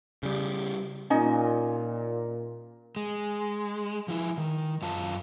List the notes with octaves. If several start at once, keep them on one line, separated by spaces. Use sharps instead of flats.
C#3 G3
A#2 C#4 D#4 D#5
G#3
F3 E4
D#3
F#2 F4 A5